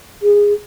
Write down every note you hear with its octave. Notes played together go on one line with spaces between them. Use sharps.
G#4